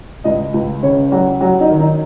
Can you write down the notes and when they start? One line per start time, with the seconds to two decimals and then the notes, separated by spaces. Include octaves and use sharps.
0.24 C#2 D#5
0.54 C#2
0.83 C#3 C#5
1.12 F#3 F#4
1.41 F#3 F#4
1.60 D#4
1.70 D#3
1.79 D#4